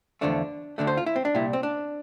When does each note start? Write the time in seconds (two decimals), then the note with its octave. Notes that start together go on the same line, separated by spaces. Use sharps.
0.21 E2 D3 F3 A3 D4
0.78 D2 D3 A3 D4
0.87 C5
0.97 F4
1.06 E4
1.16 C4
1.25 D4
1.35 C2 A#2 G3 E4
1.53 C4
1.63 D4